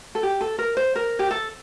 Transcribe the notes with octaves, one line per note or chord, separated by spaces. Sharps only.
A4
G4
A4
A#4
C5
A#4
G4
A4